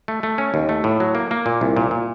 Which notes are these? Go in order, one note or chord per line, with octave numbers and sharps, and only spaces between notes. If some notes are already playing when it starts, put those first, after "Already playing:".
A3
A3
C#4
D#2
A3
A2
F#3
A#3
A#3
A#2
C2
A#2
A#2